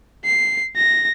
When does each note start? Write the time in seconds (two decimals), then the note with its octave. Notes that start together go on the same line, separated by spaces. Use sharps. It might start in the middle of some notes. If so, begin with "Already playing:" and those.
0.25 C7
0.77 A#6